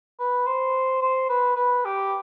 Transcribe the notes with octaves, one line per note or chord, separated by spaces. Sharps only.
B4
C5
C5
B4
B4
G4